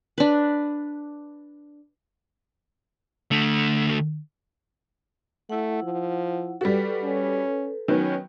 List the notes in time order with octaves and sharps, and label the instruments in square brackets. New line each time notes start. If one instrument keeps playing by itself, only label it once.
[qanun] D4 B4
[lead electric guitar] D3 A3
[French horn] A3 [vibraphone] E4 F#5
[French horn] F3
[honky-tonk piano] G3 F#4 [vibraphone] A4 B4
[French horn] C#4
[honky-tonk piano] D#3 F#3 B3 [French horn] C#4